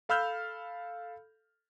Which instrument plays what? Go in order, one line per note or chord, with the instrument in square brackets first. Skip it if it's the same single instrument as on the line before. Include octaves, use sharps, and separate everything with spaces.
[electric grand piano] A4 F5 B5 E6 F6 G6